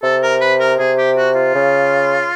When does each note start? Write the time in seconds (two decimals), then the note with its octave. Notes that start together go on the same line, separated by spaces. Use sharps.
0.03 C3 A4
0.23 A#4
0.41 B4
0.60 A#4
0.79 C3 G#4
0.98 G4
1.17 F#4
1.35 F4
1.55 C#3